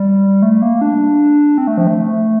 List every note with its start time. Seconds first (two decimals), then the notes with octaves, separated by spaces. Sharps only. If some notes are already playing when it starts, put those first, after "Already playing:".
Already playing: G3
0.42 A3
0.62 A#3
0.81 D4
1.58 C4
1.67 A3
1.78 F3
1.87 A3